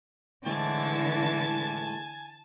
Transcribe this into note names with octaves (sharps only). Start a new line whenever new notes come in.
A2 D3 E3 G#3 G#5 A5